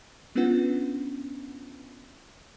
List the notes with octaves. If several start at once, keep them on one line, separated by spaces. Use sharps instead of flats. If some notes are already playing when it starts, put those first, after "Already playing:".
B3 C#4 D4 F4 B4 F#5